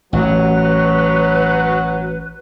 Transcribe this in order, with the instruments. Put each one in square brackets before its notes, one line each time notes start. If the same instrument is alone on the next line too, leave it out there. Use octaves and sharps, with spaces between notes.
[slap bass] A1 [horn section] F#3 [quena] B4